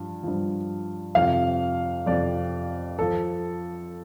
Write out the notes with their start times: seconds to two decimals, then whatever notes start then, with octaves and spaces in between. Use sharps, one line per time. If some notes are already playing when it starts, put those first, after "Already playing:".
Already playing: G2 F3
0.24 G2 F3
1.15 F2 C3 F3 F5
2.06 F2 C3 F3 D5
2.99 F3 A4